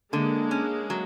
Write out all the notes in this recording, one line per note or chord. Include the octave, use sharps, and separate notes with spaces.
D3 G#3 A#3
C#4
F#3